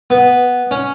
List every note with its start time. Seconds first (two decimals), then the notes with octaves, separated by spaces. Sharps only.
0.10 B3
0.71 C#4